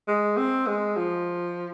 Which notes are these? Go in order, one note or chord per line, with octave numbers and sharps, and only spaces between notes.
G#3
C4
G#3
F3